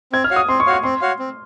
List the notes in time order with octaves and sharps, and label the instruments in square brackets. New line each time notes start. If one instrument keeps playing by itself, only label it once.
[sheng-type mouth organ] C4 [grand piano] G#6
[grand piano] F6
[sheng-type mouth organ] F#4 C#5 F5
[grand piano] D#6
[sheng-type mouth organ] C4 [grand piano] C6
[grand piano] C#6
[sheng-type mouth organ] F#4 C#5 F5
[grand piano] C#6
[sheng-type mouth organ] C4 [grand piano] C6
[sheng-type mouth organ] F#4 C#5 F5
C4